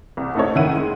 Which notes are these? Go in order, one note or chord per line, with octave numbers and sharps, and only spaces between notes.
C2
A3 D#4 E4 A4 C#5
C#2 D#3 E4 F#5 D#7
G#3